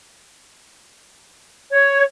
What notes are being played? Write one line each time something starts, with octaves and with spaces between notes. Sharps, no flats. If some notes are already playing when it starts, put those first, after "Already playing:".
C#5